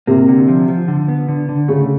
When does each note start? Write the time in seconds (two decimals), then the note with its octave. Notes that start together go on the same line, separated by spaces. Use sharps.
0.07 C3 A#3
0.28 D3
0.48 F3
0.69 F3
0.88 D3
1.08 B3
1.28 D3
1.49 D3
1.68 C#3 A3